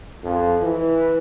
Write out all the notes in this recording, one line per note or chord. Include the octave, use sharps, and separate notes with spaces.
F2
E3